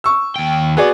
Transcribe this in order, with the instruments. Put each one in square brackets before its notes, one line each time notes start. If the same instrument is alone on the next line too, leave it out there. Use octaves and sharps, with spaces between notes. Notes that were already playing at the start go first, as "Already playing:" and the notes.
[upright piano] C#6 E6
[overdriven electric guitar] D#2 G5
[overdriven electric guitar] B3 [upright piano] F#4 G#4 D5